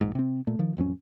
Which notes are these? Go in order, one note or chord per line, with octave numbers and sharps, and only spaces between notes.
A#1 E2 G#2
C3 C4
A#2 A3
D#3 F3
A1 F2 F#3 C#4